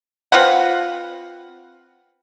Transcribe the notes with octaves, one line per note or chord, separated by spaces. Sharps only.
C4 F4 B4 F#5